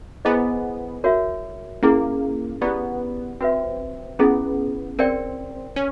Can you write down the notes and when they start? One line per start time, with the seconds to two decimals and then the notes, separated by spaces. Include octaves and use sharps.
0.25 B3 E4 G#4 C5 D#5 G#5
1.04 F#4 A#4 C#5 E5
1.83 A#3 C#4 E4 G#4
2.61 B3 E4 G4 B4 D5
3.41 C4 F#4 B4 E5
4.19 B3 C#4 E4 G#4
4.99 C4 A#4 D5 G5
5.76 C#4